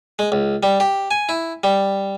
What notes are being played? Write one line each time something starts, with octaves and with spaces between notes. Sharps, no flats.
G#3
C#2
G3
G4
G#5
E4
G3